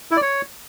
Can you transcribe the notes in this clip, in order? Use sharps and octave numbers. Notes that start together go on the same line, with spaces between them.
E4
D5
C#5